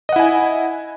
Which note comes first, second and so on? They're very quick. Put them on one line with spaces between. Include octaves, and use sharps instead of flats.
D#5 F#5 E4 G#5